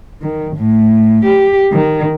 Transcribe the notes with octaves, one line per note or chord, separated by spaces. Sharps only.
D#3
A2
G4
D#3